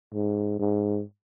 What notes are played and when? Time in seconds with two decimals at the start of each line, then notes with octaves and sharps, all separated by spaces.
0.14 G#2
0.59 G#2